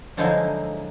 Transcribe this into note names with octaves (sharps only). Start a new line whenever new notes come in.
D3 F3 F#3 G#3 D#4 E4